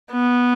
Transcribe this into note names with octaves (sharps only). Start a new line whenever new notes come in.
B3